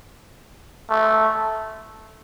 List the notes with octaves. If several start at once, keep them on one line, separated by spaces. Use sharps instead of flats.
A3